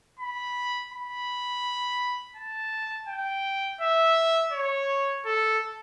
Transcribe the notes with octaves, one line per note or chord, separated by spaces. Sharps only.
B5
B5
A5
G5
E5
C#5
A4